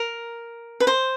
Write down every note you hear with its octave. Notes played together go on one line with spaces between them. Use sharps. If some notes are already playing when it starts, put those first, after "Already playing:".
Already playing: A#4
B4
C5